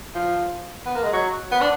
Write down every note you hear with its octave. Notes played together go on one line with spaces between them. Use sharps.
F3
B3
A#3
G#3
F#3
B3
D4